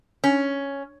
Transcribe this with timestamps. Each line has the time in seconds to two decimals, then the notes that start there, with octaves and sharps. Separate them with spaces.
0.24 C#4